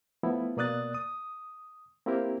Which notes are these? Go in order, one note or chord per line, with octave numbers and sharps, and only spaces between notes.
F3 A3 B3 E4
B2 A#3 D5 D#6 F#6 A6
D#6
A#3 C4 E4 G4 A#4